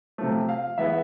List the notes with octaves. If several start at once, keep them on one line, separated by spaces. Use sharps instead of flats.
C3 F3 A3
F5
E3 G#3 B3 E5